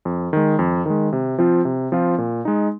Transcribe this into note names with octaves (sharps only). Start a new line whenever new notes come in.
F2
D#3 G#3
F2
D#3 G#3
C3
F3 C4 F4
C3
F3 C4 F4
A#2
G#3 D#4